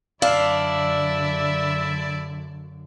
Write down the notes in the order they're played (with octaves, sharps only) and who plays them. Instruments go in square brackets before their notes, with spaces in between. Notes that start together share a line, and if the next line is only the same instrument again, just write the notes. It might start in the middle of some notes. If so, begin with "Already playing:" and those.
[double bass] F#2 D3 [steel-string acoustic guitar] D4 [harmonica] E4 D5 E5 [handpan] F5